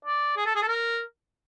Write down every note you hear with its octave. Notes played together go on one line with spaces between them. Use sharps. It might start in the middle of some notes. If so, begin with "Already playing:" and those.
D5
G#4
A4
G#4
A4
A#4